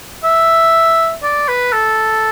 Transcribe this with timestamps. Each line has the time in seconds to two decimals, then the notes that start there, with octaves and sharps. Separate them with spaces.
0.24 E5
1.23 D5
1.48 B4
1.72 A4